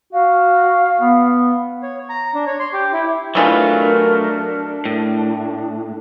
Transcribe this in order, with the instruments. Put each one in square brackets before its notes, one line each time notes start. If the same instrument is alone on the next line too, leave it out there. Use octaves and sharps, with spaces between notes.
[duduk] F#4 [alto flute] F5
[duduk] B3
[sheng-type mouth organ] C#5
A#5
D4
C#5
C6
G4
E4
[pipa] B2 E3 F4 [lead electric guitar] F#3 A3 [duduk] D4 [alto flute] A#4
[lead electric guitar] A2